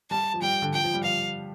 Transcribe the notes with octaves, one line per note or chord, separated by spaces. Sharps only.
G3 A5
F3
G3 G5
D3
F3 G5
F3
G3
F3 F5